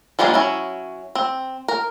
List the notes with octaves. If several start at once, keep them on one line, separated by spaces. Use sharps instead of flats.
F3 G3 G#3 A#3 D4
F#3 C#4 E4
C4
A#4